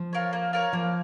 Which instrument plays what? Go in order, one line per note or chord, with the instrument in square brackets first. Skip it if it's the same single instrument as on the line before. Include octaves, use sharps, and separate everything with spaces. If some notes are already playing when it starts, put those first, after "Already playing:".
Already playing: [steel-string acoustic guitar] F3
[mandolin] F4 A#4 C#5
A#3
F4 A#4 C#5
[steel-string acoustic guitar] F3 [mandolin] A#3